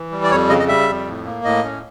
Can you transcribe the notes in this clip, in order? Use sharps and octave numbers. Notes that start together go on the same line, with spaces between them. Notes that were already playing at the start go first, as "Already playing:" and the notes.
Already playing: E3
G3
D5
F2 C#5
C#3 D#5
D#5
G3 E5
F2
A2
A#3
A2 D#5
C#4